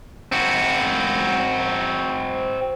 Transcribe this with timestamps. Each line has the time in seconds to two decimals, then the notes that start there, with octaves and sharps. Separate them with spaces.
0.32 C4 F#4